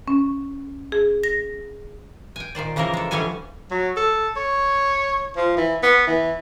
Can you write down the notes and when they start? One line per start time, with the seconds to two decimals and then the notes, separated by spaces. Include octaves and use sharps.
0.08 C#4
0.92 G#4
1.23 A#6
2.36 G5 G#5
2.55 A#2 D#3 C5 D5
2.76 C#3 E3 F3 A#3 A#4
2.94 G#3 A4
3.11 D3 E3 F3 G3 C#5 G#5
3.71 F#3
3.96 A4
4.36 C#5
5.36 F3
5.57 E3
5.83 B3
6.07 E3